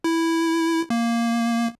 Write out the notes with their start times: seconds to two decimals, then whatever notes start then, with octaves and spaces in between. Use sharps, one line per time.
0.04 E4
0.90 A#3